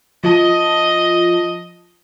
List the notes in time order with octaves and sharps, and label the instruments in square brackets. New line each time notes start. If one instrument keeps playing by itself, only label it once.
[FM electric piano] F3 F4 A5 [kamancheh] D#5